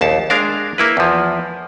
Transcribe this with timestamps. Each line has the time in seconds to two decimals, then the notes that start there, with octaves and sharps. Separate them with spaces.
0.01 A#1 D#2 A5
0.30 G#3 D4 A#4 F5
0.78 A#3 E4 B4
0.97 E2 F3